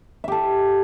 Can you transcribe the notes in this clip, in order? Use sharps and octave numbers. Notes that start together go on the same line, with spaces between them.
G4 A4 E5